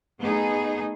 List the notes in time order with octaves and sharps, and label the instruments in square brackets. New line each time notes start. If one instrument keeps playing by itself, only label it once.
[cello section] A3 B3 D#4 G#4